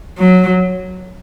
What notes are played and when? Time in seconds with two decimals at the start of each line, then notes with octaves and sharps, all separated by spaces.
0.19 F#3